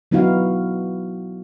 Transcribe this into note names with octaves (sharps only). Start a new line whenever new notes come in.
F#3 B3 D#4 E4 F#4 F5